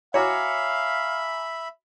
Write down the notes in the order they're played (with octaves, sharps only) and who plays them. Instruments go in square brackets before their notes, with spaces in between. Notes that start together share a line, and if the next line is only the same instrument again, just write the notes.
[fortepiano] F#4 C#5 [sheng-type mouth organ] E5 B5 [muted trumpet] F5 [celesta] G#5 A#5 D6